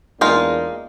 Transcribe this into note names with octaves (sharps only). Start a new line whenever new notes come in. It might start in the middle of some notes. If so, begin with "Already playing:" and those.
E2 G#3 A#3 D4 D#4 F4